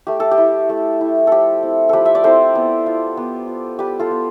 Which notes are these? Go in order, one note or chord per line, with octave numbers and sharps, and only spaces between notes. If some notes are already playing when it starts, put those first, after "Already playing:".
A3 G4
A4
G4
E4
A3
E4
F3 G4 A4
C4 E4
F3 G4 A4 B4
E5
D5
C4 E4 A4 C5
B3
F4
B3
F4
G3 G4 B4
F4 A4
B3 F4